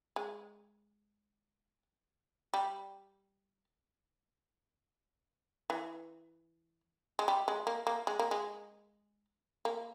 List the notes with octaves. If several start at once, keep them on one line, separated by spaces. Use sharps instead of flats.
G#3
G3
E3
G#3
G3
G#3
A#3
A#3
G#3
A#3
G#3
A#3